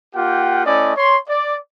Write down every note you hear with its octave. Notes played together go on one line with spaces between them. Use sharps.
A#3 F4 G4 F#5 G5
A3 C#4 E4 D5 D#5
C#5 C6
D5